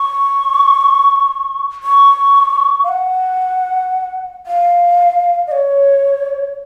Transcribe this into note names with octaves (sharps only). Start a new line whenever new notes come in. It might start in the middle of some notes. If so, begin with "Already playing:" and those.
Already playing: C#6
C#6
F5
F#5
F5
D#5
C#5